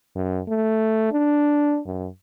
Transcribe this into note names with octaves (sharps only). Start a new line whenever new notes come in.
F#2
A3
D4
F#2